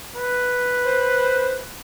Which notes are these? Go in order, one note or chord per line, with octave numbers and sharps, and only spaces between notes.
B4
C5